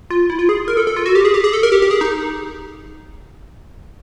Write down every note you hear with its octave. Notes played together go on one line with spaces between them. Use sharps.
F4
E4
F4
G#4
A#4
A4
A4
F4
F#4
G4
G#4
G4
G#4
A4
A#4
G4
G4
G#4
D#4